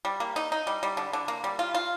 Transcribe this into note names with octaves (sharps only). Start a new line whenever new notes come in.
G3
A#3
D#4
D#4
G3
G3
D3
D3
A#3
G3
F4
F4